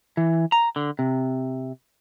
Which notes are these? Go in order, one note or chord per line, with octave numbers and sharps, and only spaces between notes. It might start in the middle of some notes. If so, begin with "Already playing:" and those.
E3
A#5
D3
C3